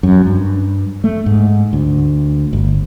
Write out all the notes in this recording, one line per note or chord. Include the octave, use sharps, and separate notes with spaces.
F#2
G2
A3
G#2
D2
G1